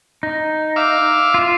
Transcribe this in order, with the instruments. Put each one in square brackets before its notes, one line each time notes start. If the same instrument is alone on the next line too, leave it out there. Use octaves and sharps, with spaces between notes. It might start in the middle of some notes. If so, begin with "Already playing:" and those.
[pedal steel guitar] D#4
[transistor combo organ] E5 F5 D6
[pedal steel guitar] F4